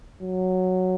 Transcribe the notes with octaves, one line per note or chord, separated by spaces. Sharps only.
F#3